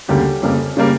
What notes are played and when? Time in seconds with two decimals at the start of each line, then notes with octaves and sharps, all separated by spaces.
0.08 D2 C#3 G3 A#3 G4
0.42 F2 C#3 G3 A#3
0.77 C#3 G3 A#3